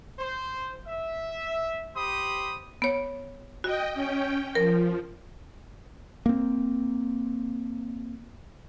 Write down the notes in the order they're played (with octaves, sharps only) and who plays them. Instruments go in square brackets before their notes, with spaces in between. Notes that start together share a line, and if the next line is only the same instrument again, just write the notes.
[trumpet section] C5
E5
G4 C5 B5 D#6
[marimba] B3 C#5
[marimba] F#4 [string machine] D#5 G5
[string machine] C#4 G5
[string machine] F3 [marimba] A#4
[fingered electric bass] A#3 C4